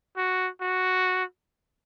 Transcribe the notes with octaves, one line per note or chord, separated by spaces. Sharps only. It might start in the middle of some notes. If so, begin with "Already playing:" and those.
F#4
F#4